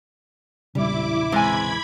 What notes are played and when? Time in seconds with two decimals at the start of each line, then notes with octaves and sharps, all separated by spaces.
0.75 E1 A#1 C#3 G3 E4 D6
1.32 C3 E3 G#3 G#5 B5 G#6